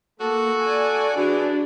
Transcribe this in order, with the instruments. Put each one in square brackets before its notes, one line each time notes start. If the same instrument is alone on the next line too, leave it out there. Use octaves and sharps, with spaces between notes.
[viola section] A#3 [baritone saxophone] F#4 [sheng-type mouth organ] A4
[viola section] D5 G#5
[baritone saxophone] E3 [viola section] D4 G#4 [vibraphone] F#4